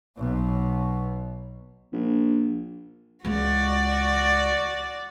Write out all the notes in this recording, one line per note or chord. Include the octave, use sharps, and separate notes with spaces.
B1 B2
A#1
C#2 C#3 F#4 D5